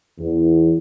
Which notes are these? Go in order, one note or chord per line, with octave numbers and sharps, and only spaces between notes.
E2